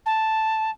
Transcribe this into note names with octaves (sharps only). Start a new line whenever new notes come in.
A5